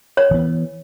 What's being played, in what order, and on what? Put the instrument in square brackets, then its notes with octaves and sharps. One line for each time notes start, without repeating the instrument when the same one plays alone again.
[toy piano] C#5
[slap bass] E3 B3